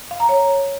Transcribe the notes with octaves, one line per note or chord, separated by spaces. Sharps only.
F5
A#5
C#5